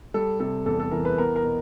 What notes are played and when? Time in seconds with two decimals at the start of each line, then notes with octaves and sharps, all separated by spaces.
0.14 G3 A4
0.40 C3 A4
0.66 E2 A4
0.80 A4
0.91 E3 A#4
1.05 B4
1.18 B3 A#4
1.36 A#4
1.43 B2